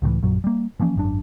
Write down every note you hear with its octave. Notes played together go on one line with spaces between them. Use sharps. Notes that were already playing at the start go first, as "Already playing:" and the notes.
C#2 A2 D#3 E3
A#1 F#2 F#3
G3 A#3
E3 F3 A#3 C#4
G#1 F#2 D4